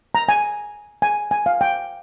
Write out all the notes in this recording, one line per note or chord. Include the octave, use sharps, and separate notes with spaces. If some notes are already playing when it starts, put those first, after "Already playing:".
A#5
G#5
G#5
G#5
F5
G5